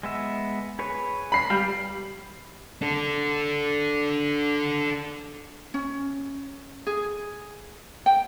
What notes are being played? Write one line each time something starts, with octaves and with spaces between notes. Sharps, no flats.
G#3 B3 E5
G#4 B4 C#5
B5 C7
G3 G4 F5
D4 A4
C#4
G#4
G5